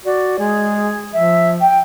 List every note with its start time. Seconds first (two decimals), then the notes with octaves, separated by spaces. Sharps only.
0.05 F#4 D5
0.39 G#3 G#4
1.13 F3 E5
1.61 G5